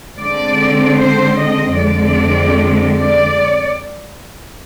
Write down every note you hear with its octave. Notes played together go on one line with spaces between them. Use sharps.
D3 G#3 C4 D5
C5
D#5
F2 D3 G#3 C4 D5
D5